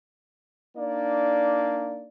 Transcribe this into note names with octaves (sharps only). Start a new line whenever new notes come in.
A#3 D4 D#4 D5